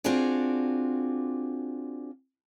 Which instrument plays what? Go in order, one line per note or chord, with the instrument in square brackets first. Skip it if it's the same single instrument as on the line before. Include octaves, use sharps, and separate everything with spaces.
[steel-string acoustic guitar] C4 D4 F4 F#4 G#4 D5